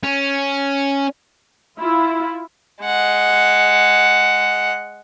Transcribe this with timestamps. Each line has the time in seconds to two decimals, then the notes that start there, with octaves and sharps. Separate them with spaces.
0.03 C#4
1.80 E4 F4
2.82 G#3 F#5